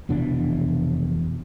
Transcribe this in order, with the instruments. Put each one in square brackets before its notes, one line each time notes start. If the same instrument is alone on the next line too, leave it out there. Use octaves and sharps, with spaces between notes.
[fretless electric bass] F1 B2 E3 D4